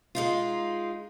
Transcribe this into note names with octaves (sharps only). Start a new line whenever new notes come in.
G#3 D#4 F4